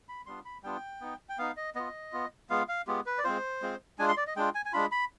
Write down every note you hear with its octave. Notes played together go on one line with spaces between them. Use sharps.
B5
G3 B3 D4 F4 C6
B5
G3 B3 D4 F4 G5
B3 D#4
G5
B3 D#4 F5
D#5
B3 F4 D#5
B3 F4
G#3 B3 F4 F5
F5
G#3 B3 F4 G4
B4
D5
G#3 C4 F4 C5
G#3 C4 F4
G#3 D4 F4 G#5
C6
D5
D#5
G#3 D4 F4 G5
G#5
G#5
G#3 D4 F4 B5
B5